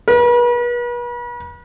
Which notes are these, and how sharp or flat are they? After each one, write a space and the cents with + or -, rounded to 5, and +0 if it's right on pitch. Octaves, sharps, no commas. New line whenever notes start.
B4 -40